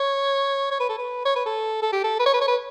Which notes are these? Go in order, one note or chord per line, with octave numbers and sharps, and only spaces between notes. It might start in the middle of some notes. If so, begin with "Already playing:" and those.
Already playing: C#5
C#5
B4
A4
B4
C#5
B4
A4
A4
G4
A4
B4
C#5
B4
C#5
B4